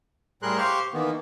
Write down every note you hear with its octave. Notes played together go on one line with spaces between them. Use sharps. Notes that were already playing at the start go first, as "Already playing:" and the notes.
A2 G3 G#4 A#4 C6 F#6
G4 C5 F5 C6 C#6 F6
D#3 E3 A#3 B3